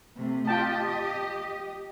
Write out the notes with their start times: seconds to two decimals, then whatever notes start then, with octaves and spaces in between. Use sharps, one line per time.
0.17 C3 A3
0.47 F4 G4 D#5 G5 A5